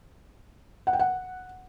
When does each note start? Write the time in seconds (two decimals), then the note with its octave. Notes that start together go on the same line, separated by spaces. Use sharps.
0.87 F#5
0.93 G5
0.99 F#5